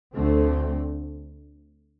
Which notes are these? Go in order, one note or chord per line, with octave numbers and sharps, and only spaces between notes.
D2 D3 A3 C4